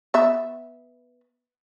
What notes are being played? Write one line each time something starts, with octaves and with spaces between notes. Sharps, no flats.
B3 E5